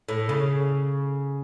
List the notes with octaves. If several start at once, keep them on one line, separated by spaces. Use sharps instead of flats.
A2
C#3